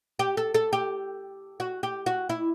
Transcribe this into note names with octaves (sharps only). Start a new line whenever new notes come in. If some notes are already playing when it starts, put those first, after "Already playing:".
G4
A4
A4
G4
F#4
G4
F#4
E4